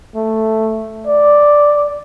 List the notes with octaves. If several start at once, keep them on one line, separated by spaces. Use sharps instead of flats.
A3
D5